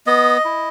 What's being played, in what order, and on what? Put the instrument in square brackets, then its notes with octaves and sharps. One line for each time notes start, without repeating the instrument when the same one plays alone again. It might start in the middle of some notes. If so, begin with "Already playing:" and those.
[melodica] B3 D#5
E4